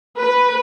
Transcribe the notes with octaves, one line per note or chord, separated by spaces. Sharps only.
B4